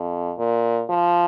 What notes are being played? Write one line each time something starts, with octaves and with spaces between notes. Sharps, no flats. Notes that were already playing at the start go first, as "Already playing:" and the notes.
Already playing: F2
A#2
F3